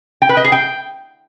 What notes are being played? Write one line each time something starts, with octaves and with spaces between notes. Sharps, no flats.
G5
B4
D#5
G#4
G5